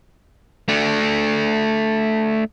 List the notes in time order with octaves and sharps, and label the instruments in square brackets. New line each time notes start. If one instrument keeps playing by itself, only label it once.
[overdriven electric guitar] A3 D4